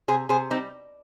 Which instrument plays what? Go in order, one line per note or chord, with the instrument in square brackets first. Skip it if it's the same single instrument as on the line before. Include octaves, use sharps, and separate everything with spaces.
[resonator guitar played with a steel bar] C3 G#4 C5
C3 G#4 C5
G3 C4 D#4